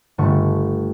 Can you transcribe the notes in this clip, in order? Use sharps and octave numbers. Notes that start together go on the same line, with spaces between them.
G1 D3 A3 C#6